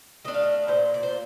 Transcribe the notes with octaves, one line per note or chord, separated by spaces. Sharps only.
A3 D4 D#5
F5
D#5
A#2 C5
D5
C5